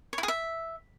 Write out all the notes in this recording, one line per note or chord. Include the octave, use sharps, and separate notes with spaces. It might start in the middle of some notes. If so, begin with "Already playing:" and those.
C#5
E4
G#4
E5